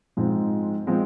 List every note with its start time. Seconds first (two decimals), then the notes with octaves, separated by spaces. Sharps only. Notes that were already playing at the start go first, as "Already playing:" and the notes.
0.17 G#2 F3 G#3 C4
0.87 F3 G#3 C4